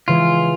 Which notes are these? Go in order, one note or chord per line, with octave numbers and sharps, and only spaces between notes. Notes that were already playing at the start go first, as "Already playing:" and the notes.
C#3 E3 G#3 F4